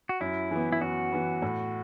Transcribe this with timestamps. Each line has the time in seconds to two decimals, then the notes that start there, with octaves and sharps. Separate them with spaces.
0.09 F#4
0.21 F#2 E4
0.51 E3 B3
0.72 E4
0.81 F#2 F#4
1.12 E3 B3
1.42 A2